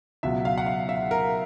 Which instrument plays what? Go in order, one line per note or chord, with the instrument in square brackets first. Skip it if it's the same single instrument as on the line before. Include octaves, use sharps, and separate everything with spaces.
[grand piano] C#2 B2 F#3 E5
F5
F#5
F5
E5
A#4